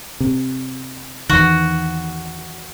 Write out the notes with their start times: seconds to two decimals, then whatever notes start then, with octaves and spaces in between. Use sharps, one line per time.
0.20 C3
1.29 E2 D#3 F#4